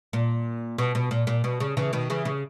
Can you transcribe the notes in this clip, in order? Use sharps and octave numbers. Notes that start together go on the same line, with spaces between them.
A#2
B2
B2
A#2
A#2
B2
C#3
C#3 E3
B2 D#3
C#3 E3
C#3